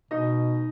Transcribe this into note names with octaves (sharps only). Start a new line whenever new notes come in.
B2 D#4 D#5